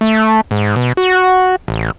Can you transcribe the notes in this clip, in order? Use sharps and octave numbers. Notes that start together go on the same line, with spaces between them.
A3
G#2
B2
F#4
A1